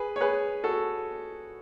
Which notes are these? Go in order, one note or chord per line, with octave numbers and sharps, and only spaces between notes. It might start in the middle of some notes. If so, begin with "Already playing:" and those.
Already playing: G#4 B4
C#5
G#4 B4
F#4 A4